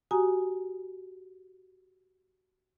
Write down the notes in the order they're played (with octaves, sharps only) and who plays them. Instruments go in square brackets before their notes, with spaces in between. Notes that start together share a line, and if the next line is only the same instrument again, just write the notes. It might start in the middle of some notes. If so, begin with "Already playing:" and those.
[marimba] F#4 G4 G#5 A#5 D#6